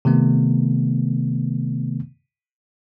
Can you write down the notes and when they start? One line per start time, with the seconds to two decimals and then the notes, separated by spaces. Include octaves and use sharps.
0.05 C3 D#3 A3 B3